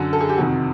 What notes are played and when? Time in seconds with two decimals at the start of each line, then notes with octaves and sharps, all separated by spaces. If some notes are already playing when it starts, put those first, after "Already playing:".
Already playing: F#2 D3 F#4
0.13 A4
0.21 G#4
0.29 G4
0.38 F2 C3 D#3 F#4